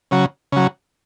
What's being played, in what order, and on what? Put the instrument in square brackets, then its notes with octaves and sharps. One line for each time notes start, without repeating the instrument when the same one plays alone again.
[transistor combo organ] C#3 F#3
C#3 F#3